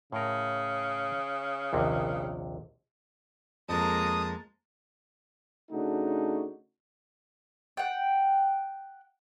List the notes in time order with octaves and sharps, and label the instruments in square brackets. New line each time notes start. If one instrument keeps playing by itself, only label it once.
[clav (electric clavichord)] A2 A#4 [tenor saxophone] C#3
[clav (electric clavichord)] A#1 D#2 C3
[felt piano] F2 [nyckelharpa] G#3 A#3 [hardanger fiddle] A5 A#5 [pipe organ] D#6
[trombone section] C#3 A3 D4 D#4 F#4
[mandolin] F#5 G5